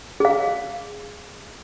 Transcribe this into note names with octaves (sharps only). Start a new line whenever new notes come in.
G#4 F5